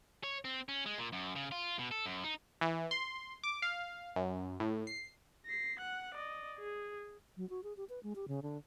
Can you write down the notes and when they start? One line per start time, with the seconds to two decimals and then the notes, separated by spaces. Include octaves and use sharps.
0.23 C#5
0.45 C4
0.69 C#4
0.86 G#3
0.98 A#2
1.13 F#2
1.36 C#3
1.52 F4
1.79 B2
1.91 A4
2.06 F#2
2.24 D#4
2.61 E3
2.91 C6
3.44 D6
3.62 F5
4.16 F#2
4.60 A2
4.87 C7
5.46 A#6 C7
5.79 F#5 F#6
6.14 D5 D#5
6.59 G#4
7.37 F#3
7.50 F#4
7.64 G#4
7.77 G4
7.89 B4
8.03 G#3
8.16 G4
8.28 C#3
8.43 D3